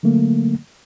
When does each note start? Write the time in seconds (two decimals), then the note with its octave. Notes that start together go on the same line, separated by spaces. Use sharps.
0.03 D3 F#3 A3 A#3